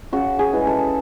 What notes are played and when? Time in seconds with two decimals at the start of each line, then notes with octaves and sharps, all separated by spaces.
0.12 C#3 F#4
0.39 G#4
0.53 E3 G#3
0.67 A4